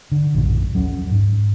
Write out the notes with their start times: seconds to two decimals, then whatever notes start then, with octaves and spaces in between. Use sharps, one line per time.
0.12 D3
0.35 A#1 F#2 A2 F#3
0.74 D#2 F#3 C#4
1.12 G#2